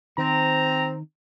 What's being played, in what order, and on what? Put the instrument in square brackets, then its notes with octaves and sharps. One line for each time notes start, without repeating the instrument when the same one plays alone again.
[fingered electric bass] D#3 [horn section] C4 [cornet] A#5